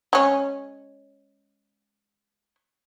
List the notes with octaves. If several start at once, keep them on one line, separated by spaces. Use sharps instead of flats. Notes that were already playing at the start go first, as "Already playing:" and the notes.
G#3 C#4